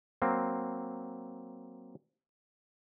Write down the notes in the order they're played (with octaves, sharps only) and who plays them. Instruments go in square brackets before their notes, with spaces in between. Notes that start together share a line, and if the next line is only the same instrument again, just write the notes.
[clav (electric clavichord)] F#3 A#3 C4